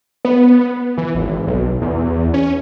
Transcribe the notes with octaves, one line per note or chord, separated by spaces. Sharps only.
B3
E3
G#1
B1
E2
C#4